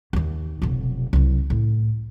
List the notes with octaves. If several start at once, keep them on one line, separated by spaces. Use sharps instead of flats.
D#2 D#3
F1 B1
C2 F#3
A2